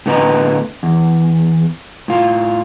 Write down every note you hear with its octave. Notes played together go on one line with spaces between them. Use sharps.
A2 D3 B3 B4 D#5 A#5
E2
A2 F4